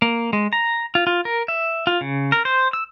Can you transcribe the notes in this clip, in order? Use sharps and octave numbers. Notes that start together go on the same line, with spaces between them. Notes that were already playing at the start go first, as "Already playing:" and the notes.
A#3
G#3
A#5
F4
F4
A#4
E5
F4
C#3
A#4
C5
E6